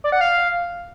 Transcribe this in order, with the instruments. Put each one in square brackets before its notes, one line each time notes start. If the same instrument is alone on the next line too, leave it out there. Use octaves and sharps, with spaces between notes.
[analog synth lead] D5
F#5
F5